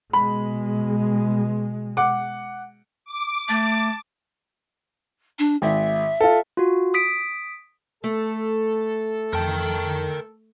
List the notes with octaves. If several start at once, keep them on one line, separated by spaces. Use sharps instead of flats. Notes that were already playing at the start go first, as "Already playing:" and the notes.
B2 G#3 B5
F#5 D6
D6
A3 A5
D4
G#1 E5
F4 A4
F4 F#4
D#6 B6 D7
A3 A4
F2 A#4 G5 A5